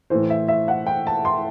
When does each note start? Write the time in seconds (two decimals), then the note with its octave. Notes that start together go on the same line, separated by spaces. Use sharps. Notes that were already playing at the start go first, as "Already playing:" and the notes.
0.10 A2 E3 C5
0.30 E5
0.48 E5
0.68 F#5
0.87 G5
1.07 A5
1.25 C6